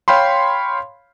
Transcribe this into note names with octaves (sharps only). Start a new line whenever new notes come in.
C#5 F5 G5 B5 C6